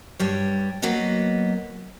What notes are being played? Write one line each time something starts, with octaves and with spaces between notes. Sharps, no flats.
G2 G3 C#5
F#3 A#3 B3 F#4 D#5